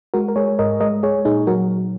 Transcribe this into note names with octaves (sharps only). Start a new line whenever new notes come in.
G#3 F#4 A#4
A#4
G#3 G#4 C#5
G#2 A#4 D#5
G#3 A#4 D#5
G#3 G#4 C#5
A#2 D#4 G#4
F#3 F#4 A#4